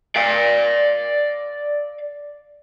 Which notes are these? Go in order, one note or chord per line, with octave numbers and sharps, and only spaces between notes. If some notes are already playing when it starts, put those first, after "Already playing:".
D5 F5